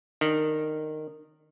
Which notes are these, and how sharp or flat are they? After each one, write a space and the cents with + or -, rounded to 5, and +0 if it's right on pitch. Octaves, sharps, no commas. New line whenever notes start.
D#3 -15 D4 +0